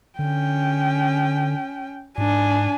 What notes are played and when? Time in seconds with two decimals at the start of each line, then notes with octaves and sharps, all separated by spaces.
0.19 D3 C#4 G5
2.18 G#2 D4 G#5